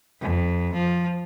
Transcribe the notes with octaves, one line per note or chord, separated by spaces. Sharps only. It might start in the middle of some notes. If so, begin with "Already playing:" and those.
F2
F3